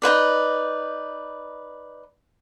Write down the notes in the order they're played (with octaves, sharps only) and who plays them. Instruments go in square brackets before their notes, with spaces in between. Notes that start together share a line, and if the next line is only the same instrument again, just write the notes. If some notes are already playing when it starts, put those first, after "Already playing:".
[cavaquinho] D#4 E4 B4 D5